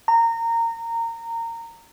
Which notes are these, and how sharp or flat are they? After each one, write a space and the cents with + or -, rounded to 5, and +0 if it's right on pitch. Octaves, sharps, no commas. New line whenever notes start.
A#5 -20